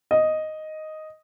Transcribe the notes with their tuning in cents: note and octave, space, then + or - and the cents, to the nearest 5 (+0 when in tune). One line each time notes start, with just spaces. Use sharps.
D#5 +0